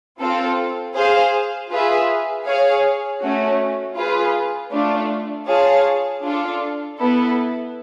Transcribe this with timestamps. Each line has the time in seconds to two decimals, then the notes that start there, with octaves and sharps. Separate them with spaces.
0.19 C4 F4 A4
0.94 G#4 C5 F5
1.69 F4 G#4 B4 E5
2.45 G#4 C#5 F5
3.21 A3 C#4 F#4
3.96 F4 G#4 B4
4.71 A3 D4 F4
5.48 F4 G#4 C#5 F5 A5
6.23 D4 F4 A4
6.99 B3 E4 A4